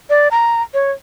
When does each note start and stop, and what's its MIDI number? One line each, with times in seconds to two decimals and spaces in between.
0.10 0.28 74
0.31 0.62 82
0.74 0.91 73